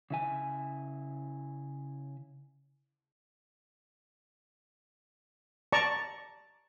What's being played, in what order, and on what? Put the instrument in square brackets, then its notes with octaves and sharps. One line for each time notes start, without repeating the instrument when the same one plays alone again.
[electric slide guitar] C#3 E4 G#5
[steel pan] D5 A5 A#5 C#6